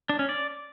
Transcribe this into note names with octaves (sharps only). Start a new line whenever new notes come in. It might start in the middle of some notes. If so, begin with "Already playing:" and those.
D4
C#4
D5